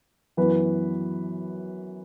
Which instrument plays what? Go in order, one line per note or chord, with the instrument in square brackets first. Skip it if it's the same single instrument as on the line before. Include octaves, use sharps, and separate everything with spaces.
[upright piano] F#2 E3 B3 B4